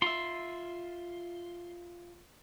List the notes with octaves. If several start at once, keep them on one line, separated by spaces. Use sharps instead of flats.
F4 E5 C6